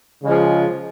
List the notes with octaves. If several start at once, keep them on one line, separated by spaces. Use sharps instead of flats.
C#3 F3 G#3